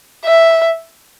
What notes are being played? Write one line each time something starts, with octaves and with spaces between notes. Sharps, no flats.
E5